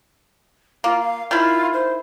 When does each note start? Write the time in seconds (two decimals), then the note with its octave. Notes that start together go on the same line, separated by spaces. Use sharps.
0.84 A#3 F4
1.00 F5
1.31 D#3 E4 F4
1.73 C5